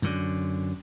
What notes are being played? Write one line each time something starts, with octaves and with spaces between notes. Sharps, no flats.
F#2 D3